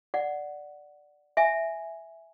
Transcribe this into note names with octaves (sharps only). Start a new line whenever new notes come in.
D5 F#5
E5 G#5